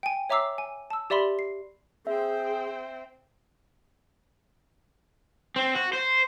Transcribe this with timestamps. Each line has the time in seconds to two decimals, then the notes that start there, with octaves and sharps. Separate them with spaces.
0.03 G5 G#5
0.30 C#5 E5 A#5 D6 E6 C7
0.58 G#5
0.90 A5 E6
1.10 G4 D5 E5 B5 C6
1.39 C7
2.07 C4 G#4 C5 E5 G5
5.56 C4
5.75 F#4
5.93 C5